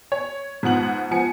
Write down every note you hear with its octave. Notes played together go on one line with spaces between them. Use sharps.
C#5
G#2 F3 B3 F#7
F3 B3 G#5 C#7